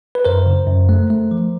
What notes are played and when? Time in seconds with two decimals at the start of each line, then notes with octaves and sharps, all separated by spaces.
0.15 B4
0.25 F#2 A#4 C5
0.46 C#3
0.67 F#2
0.89 A3
1.10 A3
1.31 F3